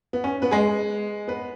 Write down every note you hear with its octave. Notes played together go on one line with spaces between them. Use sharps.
B3
C#4
B3 B4
G#3 G#4
B3 B4